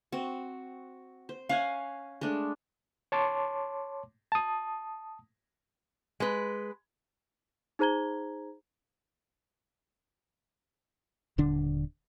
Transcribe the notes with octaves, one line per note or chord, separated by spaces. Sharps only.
C4 F#4
C5
C#4 F5 F#5 G#5
G#3 A3 D4
C#5 A5 C6 D6
A5 D#6
G#3 B4
D#4 G#4 C5 A#5 G#6 G7
D#1 D3 D4